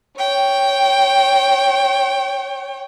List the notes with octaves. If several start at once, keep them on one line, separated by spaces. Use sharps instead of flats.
C#5 G5